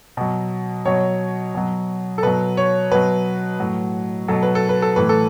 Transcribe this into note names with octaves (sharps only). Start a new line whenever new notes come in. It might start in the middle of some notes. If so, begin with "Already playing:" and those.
B2 F#3
B2 F#3 C#5
B2 F#3
A4
B2 F#3 B4
C#5
B2 F#3 B4
A2 F#3
B2 F#3 A4
B4
A4
B4
A4
A2 E3 B4
A4